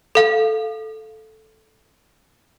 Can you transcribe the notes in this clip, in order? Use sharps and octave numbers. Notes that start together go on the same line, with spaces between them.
A4 F5